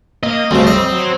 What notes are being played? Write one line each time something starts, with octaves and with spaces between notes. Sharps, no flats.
A#3 D#5
D2 C#3 G3 C4
D#5
F#3